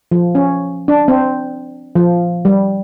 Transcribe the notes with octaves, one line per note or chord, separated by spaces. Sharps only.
F3
C#4
D4
C4
F3
G3